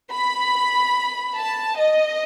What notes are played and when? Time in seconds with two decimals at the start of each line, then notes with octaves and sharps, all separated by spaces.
0.10 B5
1.35 A5
1.76 D#5